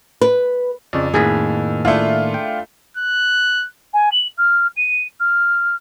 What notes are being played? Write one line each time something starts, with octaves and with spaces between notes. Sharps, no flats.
B4
F2 C#3 D5
A2 D#3 A#3 G#4 B4
A3 D4 E4 F4
G5
F#6
G#5
F#7
F6
D#7
F6